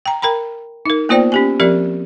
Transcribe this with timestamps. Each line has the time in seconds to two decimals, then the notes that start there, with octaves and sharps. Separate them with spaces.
0.06 G5 A#5
0.22 A#4 G5 A#5 B5
0.86 D#4 A#4
1.09 A#3 B3 F4 C5 D5 G5
1.32 C#4 G4 G#5
1.60 F3 C4 G4 A#4 D5